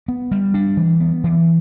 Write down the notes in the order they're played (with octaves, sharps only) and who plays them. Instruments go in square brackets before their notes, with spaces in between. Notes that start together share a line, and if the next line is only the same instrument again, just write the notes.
[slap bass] B3
G3
D4
E3
B3
E3